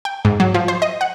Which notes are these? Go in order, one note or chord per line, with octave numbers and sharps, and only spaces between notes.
G5
G#2
F#3
F3
C5
D#5
F#5